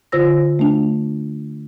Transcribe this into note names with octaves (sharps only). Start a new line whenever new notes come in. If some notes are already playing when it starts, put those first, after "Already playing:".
D3 F4 C5 E6 A#6
A3 D4